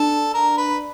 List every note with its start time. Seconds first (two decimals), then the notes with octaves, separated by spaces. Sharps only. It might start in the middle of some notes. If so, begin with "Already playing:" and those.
Already playing: D4 A4
0.34 A#4
0.57 B4